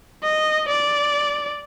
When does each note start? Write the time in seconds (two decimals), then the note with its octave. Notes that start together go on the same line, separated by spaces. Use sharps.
0.23 D#5
0.68 D5